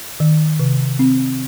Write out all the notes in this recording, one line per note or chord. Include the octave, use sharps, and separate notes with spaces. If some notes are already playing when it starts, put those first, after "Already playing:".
D#3
C3
C4